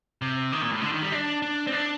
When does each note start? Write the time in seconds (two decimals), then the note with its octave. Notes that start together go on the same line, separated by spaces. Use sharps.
0.22 C3
0.52 D#3
0.62 A#2
0.72 A2
0.82 D3
0.92 D#3
1.02 G3
1.12 D4
1.42 D4
1.67 C4
1.72 D4